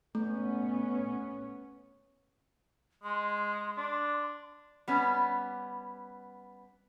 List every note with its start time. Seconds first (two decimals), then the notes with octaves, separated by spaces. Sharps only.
0.15 A3 B3 C#4
3.03 G#3 C6
3.78 D4
4.88 G3 B3 C#4